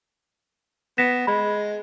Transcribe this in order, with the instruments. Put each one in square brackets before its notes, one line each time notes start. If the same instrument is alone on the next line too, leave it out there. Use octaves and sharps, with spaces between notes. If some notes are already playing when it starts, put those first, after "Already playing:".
[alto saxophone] B3 [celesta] A#6 B6 E7
[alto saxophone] G#3 [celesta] B5